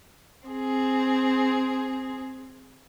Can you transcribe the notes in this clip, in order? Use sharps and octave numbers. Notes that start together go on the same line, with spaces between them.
C4 G#4